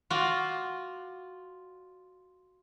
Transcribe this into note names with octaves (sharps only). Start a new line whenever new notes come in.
F4 F#4 D5